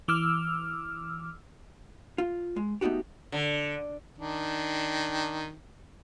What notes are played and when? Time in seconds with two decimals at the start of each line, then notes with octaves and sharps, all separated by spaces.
0.08 E3 D6 E6 F6
2.18 F4
2.56 G#3
2.81 A3 B3 D#4 F#4 G4
3.32 D3
4.18 D#3 D4